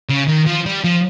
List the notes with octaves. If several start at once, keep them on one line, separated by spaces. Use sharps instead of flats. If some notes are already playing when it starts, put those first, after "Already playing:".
C#3
D#3
F3
G3
F3